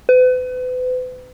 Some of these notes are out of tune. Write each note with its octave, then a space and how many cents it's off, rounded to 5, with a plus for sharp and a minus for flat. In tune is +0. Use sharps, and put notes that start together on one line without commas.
B4 +40